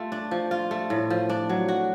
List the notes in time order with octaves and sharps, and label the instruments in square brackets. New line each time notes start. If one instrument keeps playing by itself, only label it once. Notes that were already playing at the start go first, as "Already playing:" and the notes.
Already playing: [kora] A3 F4
D4
F3
F4
A3
A2
F3
D4
F#3
F#4